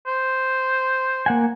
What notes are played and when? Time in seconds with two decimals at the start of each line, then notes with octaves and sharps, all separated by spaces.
0.07 C5
1.26 A#3 F#5 G#5